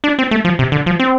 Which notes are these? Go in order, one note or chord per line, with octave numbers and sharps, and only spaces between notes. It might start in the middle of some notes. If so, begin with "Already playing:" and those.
D4
C4
A3
F3
C3
D3
F3
C4